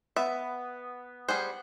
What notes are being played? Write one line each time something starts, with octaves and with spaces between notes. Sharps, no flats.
B3 E5
G3 G#4 C5 F#5